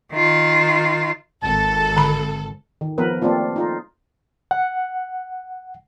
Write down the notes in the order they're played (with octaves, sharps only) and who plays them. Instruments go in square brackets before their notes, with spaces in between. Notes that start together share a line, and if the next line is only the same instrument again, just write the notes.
[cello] D#3 F4
[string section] G#1 A4 [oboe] A5
[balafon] D3 B5
[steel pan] D#3
F3 B3 A#4 B4
A3 A#3 C4 D4 F4
D#4 F4 A4
[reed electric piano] F#5